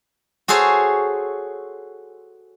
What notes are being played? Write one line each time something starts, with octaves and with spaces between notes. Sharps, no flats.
F#4 G#4 A4 C5 C#5